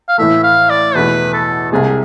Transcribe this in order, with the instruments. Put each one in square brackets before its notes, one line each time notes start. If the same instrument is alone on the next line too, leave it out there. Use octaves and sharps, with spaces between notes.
[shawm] F5
[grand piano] A2 E3 A3 [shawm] E5
[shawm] F5
D5
[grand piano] E2 B2 A3 E4 [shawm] B4
[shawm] A4
[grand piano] C2 C3 G#3 [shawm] G#4